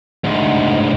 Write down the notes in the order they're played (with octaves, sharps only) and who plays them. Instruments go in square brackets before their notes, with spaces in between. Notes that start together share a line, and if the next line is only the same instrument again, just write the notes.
[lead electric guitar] D2 G#2